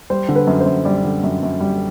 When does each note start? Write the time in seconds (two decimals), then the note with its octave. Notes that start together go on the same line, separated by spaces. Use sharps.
0.10 G3 C5
0.29 D3
0.36 B4
0.47 F#2
0.61 C5
0.66 F#2
0.85 G3 D5
1.04 D3
1.23 F#2
1.43 F#2
1.60 G3